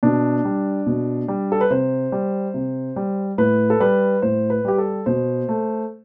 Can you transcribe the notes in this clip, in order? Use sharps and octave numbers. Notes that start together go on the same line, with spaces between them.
B2 D4
G3
B2
G3
A4
B4
C3 C5
G3
C3
G3
A2 B4
A4
G3 B4
A2 C5
B4
G3 G4
A4
B2 C5
A3